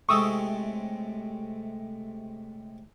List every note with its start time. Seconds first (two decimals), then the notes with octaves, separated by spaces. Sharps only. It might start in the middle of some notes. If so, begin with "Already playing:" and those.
0.09 A2 C3 G#3 C#6 D#6 E6